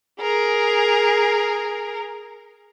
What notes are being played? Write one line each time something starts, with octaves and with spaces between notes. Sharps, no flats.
G#4 A#4